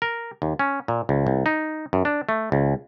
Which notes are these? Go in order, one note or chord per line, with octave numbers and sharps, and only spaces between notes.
A#4
D#2
C#4
A#2
C#2
C2
D#4
F#2
D4
A3
C#2